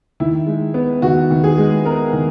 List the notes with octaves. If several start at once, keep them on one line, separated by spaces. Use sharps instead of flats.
D#3 E4
G#3
B3
D#3 F#4
D#3
G#4
G#3
B3 A#4
D#3